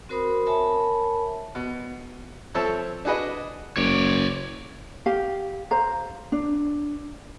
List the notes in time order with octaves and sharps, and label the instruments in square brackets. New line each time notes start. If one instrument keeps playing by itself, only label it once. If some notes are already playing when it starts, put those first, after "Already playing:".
[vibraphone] C4 F#4 A#4 C5 B5 D#6
A#4 C#5 E5 G#5 A5 B5
[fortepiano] B2
F3 C4 A4 C#5 E5 A5
D4 F#4 G#4 B4 D#5
[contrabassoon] F#1 [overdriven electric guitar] C#5 D5
[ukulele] G4 F5
C5 F5 A#5
D4